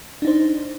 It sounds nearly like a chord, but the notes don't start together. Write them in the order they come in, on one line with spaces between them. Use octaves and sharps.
D4 D#4 C5